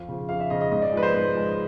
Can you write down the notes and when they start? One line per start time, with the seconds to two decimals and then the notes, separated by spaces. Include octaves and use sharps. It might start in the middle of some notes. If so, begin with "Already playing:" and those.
Already playing: F2 F5
0.08 C#3 F3
0.29 F2 F5
0.40 E5
0.50 C#3 F3 D#5
0.61 D#5
0.71 G#2 D#5
0.82 D5
0.92 F3 G#3 B4
1.03 C5
1.14 G#2
1.35 F3 G#3